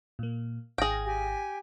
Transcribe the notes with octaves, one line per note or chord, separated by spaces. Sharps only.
A#2 A#3
G#1 G#4 F5 G5 A#6
G4 G#5